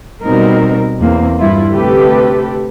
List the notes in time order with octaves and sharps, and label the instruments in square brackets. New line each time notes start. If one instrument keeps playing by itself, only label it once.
[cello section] B2 G3 C4 D#4 A#4
E2 A#3 C4
G2 E4 F4
D2 C3 G4 A4 B4